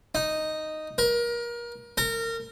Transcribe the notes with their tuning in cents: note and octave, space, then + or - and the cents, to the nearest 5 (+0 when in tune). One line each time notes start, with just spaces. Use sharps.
D#4 -5
A#4 +30
A#4 -25